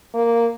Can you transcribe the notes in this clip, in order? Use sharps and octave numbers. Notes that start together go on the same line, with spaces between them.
A#3